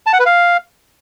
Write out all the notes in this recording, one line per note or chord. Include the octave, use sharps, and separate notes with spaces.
A5
F#5
B4
F5